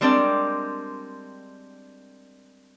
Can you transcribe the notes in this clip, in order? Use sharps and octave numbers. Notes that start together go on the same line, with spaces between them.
G3 G#3 C4 D4 A#4 D5